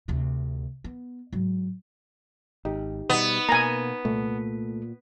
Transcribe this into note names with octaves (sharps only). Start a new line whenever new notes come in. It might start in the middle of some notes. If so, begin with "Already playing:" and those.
D2 C3
B3
G#2 F#3
G#1 D#4 G4
B2 G3 B3 D#4
B2 A#3 G#5 A#5
C2 A#2 A3 A4